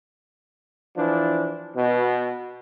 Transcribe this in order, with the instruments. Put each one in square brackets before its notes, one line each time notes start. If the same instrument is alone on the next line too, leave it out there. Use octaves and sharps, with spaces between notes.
[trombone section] E3 F3 D4
B2